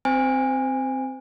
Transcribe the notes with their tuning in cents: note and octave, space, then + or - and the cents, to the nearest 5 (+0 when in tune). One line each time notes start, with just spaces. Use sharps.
C4 +0 C5 -30 G#5 -25